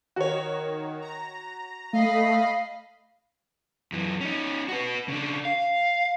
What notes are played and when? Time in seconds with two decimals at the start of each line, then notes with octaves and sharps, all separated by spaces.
0.16 D#3 F#4 C#5
1.01 A#5
1.93 A3 D#5 F5 B5
3.92 F#2 E3
4.21 C#4 D#4
4.68 F#4 B4
5.08 C#3 D4
5.45 F5